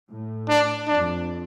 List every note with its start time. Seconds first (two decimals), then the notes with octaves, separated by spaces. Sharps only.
0.10 A2
0.49 D4
0.88 F2 D4